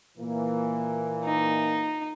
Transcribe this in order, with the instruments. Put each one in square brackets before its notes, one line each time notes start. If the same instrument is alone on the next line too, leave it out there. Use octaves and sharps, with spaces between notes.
[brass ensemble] A#2 E3 A#3
[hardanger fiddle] D#4